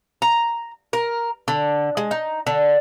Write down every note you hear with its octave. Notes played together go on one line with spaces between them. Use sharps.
A#5
A#4
D3
G#3
D#4
D3